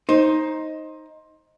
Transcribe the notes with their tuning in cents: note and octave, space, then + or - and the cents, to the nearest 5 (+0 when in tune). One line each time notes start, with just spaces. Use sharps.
D#4 +10 C5 +20